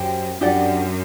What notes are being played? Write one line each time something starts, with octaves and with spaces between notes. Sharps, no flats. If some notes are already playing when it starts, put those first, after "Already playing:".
Already playing: F#2 G4 C5 G5
F#2 D4 G4 D5 F#5